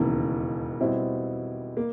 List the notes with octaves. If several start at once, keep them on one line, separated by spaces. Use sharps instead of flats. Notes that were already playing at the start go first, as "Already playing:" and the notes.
Already playing: E1 D#2 C#3 E3
B2 G3 C4 E4
A#3